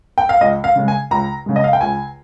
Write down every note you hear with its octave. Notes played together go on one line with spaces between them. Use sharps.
G5
F5
C#2 D#5
F5
C#3 G#3
G#5
C#2 A#5
C#3 G#3
D#5
F5
G5
C#2 G#5